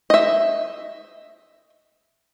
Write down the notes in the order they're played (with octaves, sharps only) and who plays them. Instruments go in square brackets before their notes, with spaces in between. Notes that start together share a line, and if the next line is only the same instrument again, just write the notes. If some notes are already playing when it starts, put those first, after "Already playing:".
[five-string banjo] D#5 E5